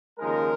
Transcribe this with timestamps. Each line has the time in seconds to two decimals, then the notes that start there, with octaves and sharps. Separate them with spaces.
0.19 D#2 C#3 F3 G#3 D#4 A#4